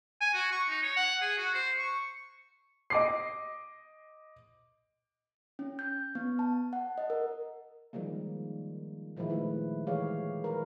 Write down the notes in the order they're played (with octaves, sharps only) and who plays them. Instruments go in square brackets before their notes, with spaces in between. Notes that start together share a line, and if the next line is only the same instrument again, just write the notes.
[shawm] G#5
F#4
C#6
D#4
C#5
F#5
G#4
F#4
C5
C#6
[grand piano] D#5 D6 C7
[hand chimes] C#4
G6
B3
A5
F#5
D#5
A#4
[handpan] D#3 F3 G3 G#3 A#3
A#2 D#3 F3 G#3 E4
F3 A3 B4
E3 G#3 G4 B4 C#5 F5
A#4 B4